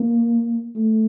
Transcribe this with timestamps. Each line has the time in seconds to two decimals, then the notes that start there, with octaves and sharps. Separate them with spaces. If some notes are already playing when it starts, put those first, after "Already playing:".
Already playing: A#3
0.76 A3